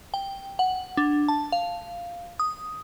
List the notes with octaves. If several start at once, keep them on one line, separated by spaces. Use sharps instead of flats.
G5
F#5
D4
A5
F5
D#6